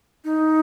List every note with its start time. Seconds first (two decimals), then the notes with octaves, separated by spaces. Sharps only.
0.25 D#4